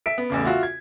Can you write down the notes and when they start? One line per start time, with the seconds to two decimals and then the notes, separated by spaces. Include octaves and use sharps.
0.06 E5 B6 D7
0.18 B3
0.30 A1 E2 C#3
0.45 F4 F#4 E5
0.63 G#6